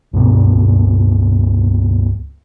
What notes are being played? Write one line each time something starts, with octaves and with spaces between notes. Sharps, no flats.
C#2 G2 B2 B3